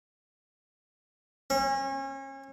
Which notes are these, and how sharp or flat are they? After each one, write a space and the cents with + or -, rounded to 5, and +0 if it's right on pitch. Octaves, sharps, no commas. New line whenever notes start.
C#4 -35